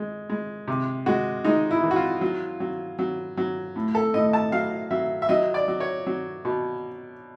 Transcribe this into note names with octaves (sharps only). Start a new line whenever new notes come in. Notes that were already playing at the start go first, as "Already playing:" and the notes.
Already playing: G#3
G#3
C3
G#3 F#4
G#3 D#4
E4
E3
F#4
F4
F#3
F#3
F#3
F#3
A2
A4
A2 D#5
A5
F#3 F5
F#3 E5
E5
F#3 D#5
D5
F#3
C#5
F#3
B2